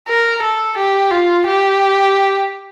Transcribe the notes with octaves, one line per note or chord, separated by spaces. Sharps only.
A#4
A4
G4
F4
G4